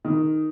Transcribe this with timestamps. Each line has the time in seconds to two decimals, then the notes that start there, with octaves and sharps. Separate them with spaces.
0.05 D#3